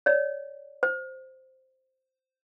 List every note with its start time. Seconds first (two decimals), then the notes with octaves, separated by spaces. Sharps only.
0.06 C#5 D5
0.83 C5